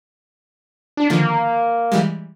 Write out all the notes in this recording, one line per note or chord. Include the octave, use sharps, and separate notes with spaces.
D4
D3 D#3 F3 A#3
E3 G3 G#3